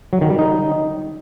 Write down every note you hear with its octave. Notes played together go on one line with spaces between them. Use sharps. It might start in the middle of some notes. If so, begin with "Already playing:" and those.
F#3
D#3
G3
D#4